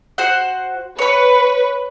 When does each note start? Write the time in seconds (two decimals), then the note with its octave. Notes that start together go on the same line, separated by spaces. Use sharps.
0.18 F#4 C5 F#5
0.99 B4 C#5 B5